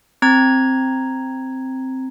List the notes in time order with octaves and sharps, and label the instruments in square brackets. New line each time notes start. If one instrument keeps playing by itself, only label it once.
[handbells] C4 A#5 G#6